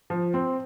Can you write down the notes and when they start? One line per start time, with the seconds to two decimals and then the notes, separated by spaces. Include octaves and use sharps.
0.10 F3
0.34 C4